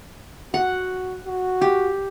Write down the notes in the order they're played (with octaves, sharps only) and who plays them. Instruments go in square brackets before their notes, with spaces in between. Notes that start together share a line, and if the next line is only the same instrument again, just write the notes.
[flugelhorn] F#4 [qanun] F#5
[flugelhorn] F#4
[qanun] G4